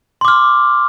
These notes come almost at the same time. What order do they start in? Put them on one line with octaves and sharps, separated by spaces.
C6 D6 F6